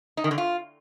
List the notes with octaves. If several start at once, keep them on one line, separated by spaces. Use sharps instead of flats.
D#4
D#3
D3
F4